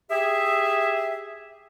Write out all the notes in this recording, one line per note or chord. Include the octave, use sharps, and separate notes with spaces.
G4 G#4 E5